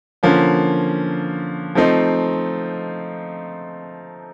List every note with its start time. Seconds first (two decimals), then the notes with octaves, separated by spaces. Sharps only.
0.23 D3 F3 A#3 C#4
1.75 F3 A3 C4 D#4